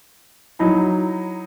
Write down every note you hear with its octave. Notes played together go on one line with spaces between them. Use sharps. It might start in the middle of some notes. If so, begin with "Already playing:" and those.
F#3 D#4 E4 B5